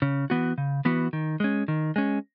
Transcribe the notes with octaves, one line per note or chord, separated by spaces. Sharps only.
C#3
E3 B3 F#4
C#3
E3 B3 F#4
D#3
G#3 C#4
D#3
G#3 C#4